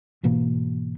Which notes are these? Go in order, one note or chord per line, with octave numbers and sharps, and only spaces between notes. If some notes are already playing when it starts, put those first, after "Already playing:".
G#2 B2 E3 A#3